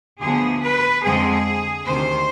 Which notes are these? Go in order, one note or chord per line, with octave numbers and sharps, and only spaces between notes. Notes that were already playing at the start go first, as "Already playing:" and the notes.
D2 D3 F3 B3 G#4
B4
F2 D3 G#3 C4 G#4
D2 C3 D#3 C5